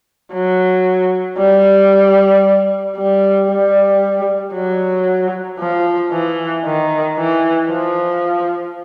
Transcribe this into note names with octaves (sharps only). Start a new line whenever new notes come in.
F#3
G3
G3
G3
F#3
F3
E3
D#3
E3
F3